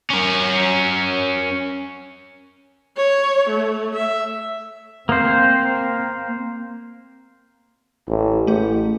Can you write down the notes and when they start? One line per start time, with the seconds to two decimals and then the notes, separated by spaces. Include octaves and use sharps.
0.10 C#4 A#4
2.97 C#5
3.50 A3
3.95 E5
5.09 A#3 C4 C5
8.08 A1
8.47 A1 A3 G#4